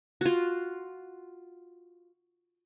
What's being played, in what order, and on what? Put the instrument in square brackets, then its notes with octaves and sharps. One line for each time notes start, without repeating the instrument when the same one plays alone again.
[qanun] F4 F#4